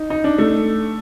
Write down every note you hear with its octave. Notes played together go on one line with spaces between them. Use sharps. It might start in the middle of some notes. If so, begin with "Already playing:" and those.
Already playing: D#4
D#4
D4
A3